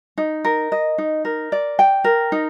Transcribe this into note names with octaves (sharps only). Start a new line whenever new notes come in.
D#4
A#4
D#5
D#4
A#4
D5
G5
A#4
D#4